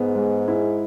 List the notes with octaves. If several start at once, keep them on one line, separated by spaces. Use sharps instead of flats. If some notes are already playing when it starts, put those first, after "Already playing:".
Already playing: G#2 B3
G#3
E4